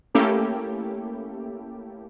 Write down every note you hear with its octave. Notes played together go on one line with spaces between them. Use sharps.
A3 A#3 C#4 E4 G4 A4